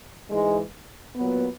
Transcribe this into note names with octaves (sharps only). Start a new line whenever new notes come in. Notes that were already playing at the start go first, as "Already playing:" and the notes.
G#2 E3 G#3
A#2 F#3 B3